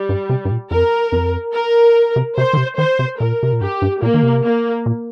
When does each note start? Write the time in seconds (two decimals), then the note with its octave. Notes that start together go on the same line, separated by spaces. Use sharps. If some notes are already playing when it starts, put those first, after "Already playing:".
Already playing: G3
0.09 G2
0.29 C3
0.45 G2
0.51 A#2
0.71 F2 A#4
1.12 F2
1.55 A#4
2.16 C3
2.38 C3 C5
2.53 D#3
2.57 C3
2.78 D#3 C5
2.99 C3
3.19 A#2 A#4
3.43 C3
3.52 A#2
3.61 G2 G4
3.82 G2
4.02 A#2 A#3
4.14 D#3
4.23 C3
4.43 A#3
4.86 A#2